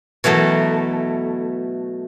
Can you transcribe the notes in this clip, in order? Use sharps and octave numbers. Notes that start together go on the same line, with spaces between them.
B2 E3 F#3 A3